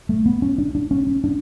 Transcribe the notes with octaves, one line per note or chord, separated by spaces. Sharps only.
A3
B3
C#4
D4
D4
C#4
C#4
D4